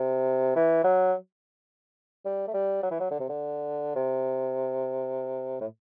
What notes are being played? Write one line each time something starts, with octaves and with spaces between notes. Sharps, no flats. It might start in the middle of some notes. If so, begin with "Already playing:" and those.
Already playing: C3
E3
F#3
G3
A3
G3
F#3
E3
F#3
D3
C3
D3
C3
A2